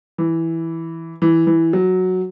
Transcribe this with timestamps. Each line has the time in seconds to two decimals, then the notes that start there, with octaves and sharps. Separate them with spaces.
0.18 E3
1.22 E3
1.47 E3
1.73 F#3